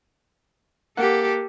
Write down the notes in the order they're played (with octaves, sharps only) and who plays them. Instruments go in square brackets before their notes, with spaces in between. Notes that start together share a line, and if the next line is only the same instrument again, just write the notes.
[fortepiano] A#3 F#5 [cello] G4 A4